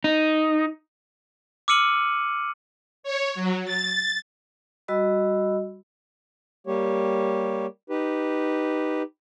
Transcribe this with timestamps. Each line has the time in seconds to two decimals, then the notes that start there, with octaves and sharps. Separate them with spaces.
0.04 D#4
1.68 D6 E6 F6 C#7 D#7 F#7
3.03 C#5
3.35 F#3
3.65 A6
4.88 G3 F#4 D#5 B5 E6
6.67 G3 A#3 G4 C#5
7.90 D#4 G4 B4